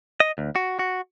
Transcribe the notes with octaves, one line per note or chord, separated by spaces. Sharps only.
D#5
D2
F#4
F#4